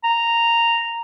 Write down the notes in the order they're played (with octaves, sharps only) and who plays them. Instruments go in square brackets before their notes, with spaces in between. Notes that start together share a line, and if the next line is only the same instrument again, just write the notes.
[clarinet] A#5